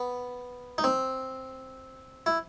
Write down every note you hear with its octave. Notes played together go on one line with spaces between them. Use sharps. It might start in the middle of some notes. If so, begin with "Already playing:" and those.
Already playing: B3
D#4
C4
E4